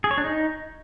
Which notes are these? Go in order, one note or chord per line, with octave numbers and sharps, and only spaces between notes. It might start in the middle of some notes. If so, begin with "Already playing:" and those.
G#4
C#5
D4
D#4